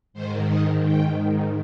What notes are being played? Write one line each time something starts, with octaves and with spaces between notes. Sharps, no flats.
G#2 D#3 C5
D#5
G5